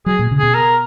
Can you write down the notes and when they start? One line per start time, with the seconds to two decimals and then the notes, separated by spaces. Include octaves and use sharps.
0.06 F#3 G#4
0.19 A#2
0.31 C#3
0.39 B2 G#4
0.55 A#4